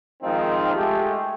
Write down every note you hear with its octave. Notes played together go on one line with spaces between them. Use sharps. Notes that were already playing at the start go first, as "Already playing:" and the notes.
D#3 F3 G#3 C4 D#4 F4
G#3 A3 G4